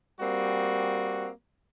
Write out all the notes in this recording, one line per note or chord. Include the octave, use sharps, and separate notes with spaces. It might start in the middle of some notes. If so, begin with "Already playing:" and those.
G3 A#3 C4 F#4